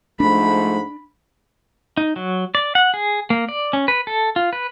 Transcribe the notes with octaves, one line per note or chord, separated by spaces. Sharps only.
G#2 F3 A3 D4 B5
D#4
F#3
D5
F#5
G#4
A#3
D5
C#4
B4
A4
F4
B4